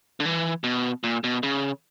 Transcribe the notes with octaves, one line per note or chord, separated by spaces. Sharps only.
D3
E3
B2
A#2
B2
C#3